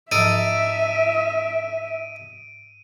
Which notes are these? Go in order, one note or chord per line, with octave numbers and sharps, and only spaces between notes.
G#2 F3 D#4 A4 E5 D7 D#7